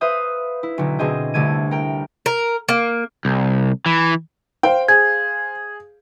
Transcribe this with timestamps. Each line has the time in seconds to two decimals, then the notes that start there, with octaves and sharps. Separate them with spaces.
0.01 B4 C5 E5 F5 D#6 G6
0.63 E4
0.78 B1 D3
0.99 B2 D3 C4 G#4 D#5 G6
1.34 C2 D3 A3 G#6 D#7
1.71 A#4 G5
2.26 A#4
2.69 A#3
3.25 C2
3.86 E3
4.63 C5 F5 G5
4.88 G#4 G#6